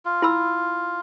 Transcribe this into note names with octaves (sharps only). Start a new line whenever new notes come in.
F4
E4 B5 E6